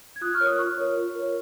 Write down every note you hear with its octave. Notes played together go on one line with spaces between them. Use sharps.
G#6
F4 D#6 F#6
C#6 F6
A#4 C#5
D#6 F#6
F4 C#6 F6
A#4 C#5
F4
A#4 C#5